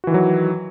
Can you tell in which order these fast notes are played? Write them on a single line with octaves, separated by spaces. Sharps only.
F#4 E3 D#3 F#3